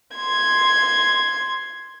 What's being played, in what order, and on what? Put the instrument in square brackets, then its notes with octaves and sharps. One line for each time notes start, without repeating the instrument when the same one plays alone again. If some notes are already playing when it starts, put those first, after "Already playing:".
[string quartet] C6 G#6